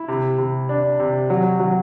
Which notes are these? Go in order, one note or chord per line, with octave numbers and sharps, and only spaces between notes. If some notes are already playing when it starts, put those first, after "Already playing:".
Already playing: E4
C3
C3
D4
C3
F#3
F#3